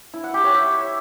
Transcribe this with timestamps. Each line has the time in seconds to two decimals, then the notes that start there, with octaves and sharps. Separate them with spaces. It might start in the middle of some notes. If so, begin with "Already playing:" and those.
0.14 E4
0.24 F#5
0.34 G4
0.44 C#5
0.54 E5